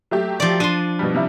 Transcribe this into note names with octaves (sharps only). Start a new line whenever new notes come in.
F#3 A3 G4
F3 D5
D4 C6 D#7
B2 G3
C3 G3 E4